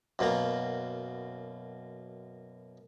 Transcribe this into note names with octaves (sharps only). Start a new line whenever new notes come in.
F#2 B2 A#3 A#5